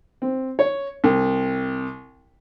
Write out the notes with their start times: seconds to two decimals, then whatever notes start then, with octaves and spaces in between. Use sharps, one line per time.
0.22 C4
0.59 C#5
1.04 C2